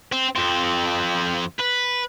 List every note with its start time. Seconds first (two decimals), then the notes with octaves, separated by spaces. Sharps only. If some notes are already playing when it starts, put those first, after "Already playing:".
0.12 C4
0.36 F2 C4
1.59 B4